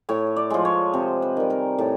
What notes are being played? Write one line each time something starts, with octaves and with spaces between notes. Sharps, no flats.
A2 C#5
D5
F3 G#3
C#5
C3 C5
B4
D#3 G3
A#4
A2 A4